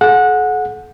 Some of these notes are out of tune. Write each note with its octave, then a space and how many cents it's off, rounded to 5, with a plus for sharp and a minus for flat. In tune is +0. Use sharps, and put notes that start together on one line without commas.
A4 -45 F#5 -20